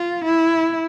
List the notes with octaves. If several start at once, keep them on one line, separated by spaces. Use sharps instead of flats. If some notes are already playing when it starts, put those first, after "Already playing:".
Already playing: F4
E4